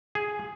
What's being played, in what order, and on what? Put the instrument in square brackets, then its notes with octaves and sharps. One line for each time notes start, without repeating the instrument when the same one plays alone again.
[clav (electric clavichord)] G#4